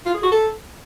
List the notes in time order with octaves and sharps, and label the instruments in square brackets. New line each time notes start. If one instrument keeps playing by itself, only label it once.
[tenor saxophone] F4
G#4
F#4
A4